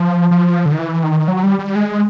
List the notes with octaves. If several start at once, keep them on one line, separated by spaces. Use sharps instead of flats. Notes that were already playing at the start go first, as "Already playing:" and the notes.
Already playing: F3
F3
D3
D#3
E3
D#3
F#3
G3
G3
G#3